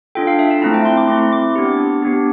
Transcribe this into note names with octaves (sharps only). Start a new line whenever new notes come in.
D4 F4 A4 G5
F5
E5
A5
A3 C4 E4 A5
G5
C6
D6
A3 C4 E4 C6
D6
B3 D4 G4
B3 D4 G4